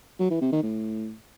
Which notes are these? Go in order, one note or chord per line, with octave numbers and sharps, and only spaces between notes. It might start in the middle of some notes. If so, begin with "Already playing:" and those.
F#3
E3
C3
D#3
A2